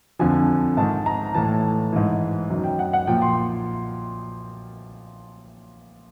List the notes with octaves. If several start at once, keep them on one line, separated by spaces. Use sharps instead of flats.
F2 D3 F3 G#5
G#2 D#3 A5
A#5
A2 E3 A5
G#2 E3
F#2 D#3
G5
F#5
F#5
A#2 F3 G5
C6